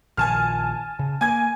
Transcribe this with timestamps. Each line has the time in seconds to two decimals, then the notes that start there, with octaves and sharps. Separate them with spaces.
0.17 A#1 D#3 G#5 A5 F6
0.99 C#3
1.21 A#3 G#5 G#6